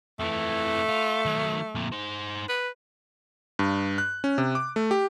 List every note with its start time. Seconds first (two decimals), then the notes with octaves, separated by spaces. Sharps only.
0.19 F2 E3 A3
0.89 F4
1.26 D#3 F#3
1.75 F2 A#2
1.92 D#4 C5
2.49 B4
3.59 G2
3.98 F#6
4.24 C#4
4.38 C3
4.55 D6
4.76 A3
4.91 G4